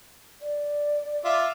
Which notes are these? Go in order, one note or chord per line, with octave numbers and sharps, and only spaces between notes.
D5
F4 E5 D6